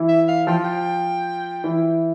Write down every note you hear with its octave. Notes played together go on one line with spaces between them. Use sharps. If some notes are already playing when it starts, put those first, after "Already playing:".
Already playing: E3 E4
E5
F5
F3 F4 G5
G5
E3 E4